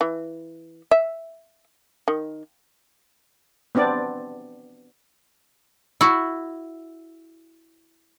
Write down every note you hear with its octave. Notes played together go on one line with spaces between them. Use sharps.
E3
E5
D#3
B3 C4 D4 D5
E4 F#4